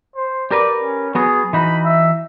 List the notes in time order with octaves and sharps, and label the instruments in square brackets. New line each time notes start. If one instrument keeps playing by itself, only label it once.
[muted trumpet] C5
[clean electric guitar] G4 A#4 B4 [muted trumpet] D5
[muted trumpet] C#4
[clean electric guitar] F#3 B3 F#4 [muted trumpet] G#4
[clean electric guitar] E3 D#4 F#4 [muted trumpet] B5
[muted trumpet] E5